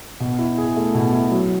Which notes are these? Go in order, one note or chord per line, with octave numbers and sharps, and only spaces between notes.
B2
E4
G#4
A3
B2
E4
F#3